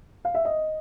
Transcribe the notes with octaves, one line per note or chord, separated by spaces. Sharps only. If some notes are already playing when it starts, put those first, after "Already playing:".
F5
E5
D#5